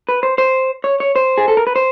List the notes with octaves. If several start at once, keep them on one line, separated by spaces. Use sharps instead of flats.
B4
C5
C5
C#5
C#5
C5
G#4
A4
A#4
B4
C5